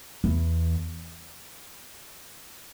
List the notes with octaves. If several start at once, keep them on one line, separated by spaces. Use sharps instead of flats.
E2